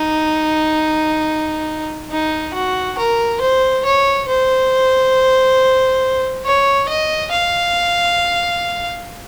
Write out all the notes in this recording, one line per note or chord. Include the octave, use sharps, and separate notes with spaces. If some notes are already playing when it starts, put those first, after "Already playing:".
Already playing: D#4
D#4
F#4
A#4
C5
C#5
C5
C#5
D#5
F5